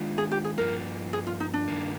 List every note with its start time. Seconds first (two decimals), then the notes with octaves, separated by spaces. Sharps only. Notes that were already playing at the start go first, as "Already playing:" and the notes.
Already playing: D#3 G#3 D4 F4
0.18 G#4
0.31 G4
0.44 G#4
0.58 G2 F3 A#3 A#4
1.13 G#4
1.27 F4
1.40 D#4
1.54 D4
1.68 G2 D#3 A#3